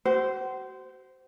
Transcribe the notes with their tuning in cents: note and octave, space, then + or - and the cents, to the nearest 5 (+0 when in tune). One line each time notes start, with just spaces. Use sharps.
F#4 +35 C5 -15